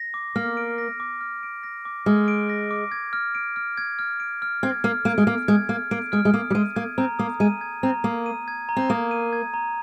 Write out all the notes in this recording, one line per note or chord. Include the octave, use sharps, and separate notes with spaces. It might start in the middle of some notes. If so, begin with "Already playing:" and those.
Already playing: A#6
D6
A#3 F6
D7
A#6
D6
F6
D7
A#6
D6
G#3 F6
D7
A#6
D6
G#6
F6
D7
F6
G#6
F6
D7
F6
C4 G#6
A#3 F6
A#3 D7
G#3
A#3 F6
G#3 G#6
A#3 F6
A#3 D7
G#3 F6
G#3
A#3 D#6
G3
G#3 D#7
A#3 G#6
C4 A#5
A#3 D#6
G#3 D#7
G#6
C4 A#5
A#3 D#6
D#7
G#6
A#5
C4
A#3 D#6
D#7
G#6
A#5